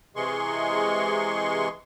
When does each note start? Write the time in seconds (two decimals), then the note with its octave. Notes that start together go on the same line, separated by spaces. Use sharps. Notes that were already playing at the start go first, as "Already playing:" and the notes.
0.16 C3 E3 G#3 G#4 C6 C#6